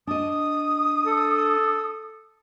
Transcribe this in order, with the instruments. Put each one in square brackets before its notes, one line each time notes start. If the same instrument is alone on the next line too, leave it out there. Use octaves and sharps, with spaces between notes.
[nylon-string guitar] D4 D#5 [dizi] D#6
[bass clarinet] A4